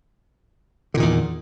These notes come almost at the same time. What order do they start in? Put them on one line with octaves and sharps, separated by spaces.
D3 A#2 D#3 E2